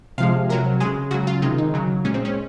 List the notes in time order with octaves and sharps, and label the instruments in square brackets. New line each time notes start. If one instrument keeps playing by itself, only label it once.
[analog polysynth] C3 F3 G#3 F5
C3 F#3 A#4
G#3 G#4
C#3
C#3 F#3 F#4
F4
C3 D#3 G#3 F4
D#4
C#3 F#3
A#2 G#3 C#4
C4
C#4